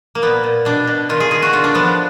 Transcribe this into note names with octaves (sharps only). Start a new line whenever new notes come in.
A#3
A#2 B3
A#2
B2 D4
B2
D#3 F4
G#4
D#3 G#4
F#4
D3 F4
D4
F3 B3